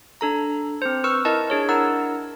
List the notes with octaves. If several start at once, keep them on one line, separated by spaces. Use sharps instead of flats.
D4 A4 A#5
C4 C5
B4 C#6 E6 F6
E4 A#4 D#5 A5
D4 G#4 C#5
D4 E4 A#4 F#5 A#5 E6